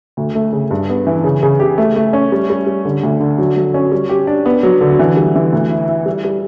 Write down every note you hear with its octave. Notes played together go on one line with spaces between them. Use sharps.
D2
A3
C#3
G2
B3
E3
C#3
C#3
G4
A3
A3
C#4
G3
G3
G3
D3
D2
D3
F#3
F#3
C#4
G3
G4
D4
B3
F#3
D3
E3
G3
E3
D2
E4
E4
G3
G3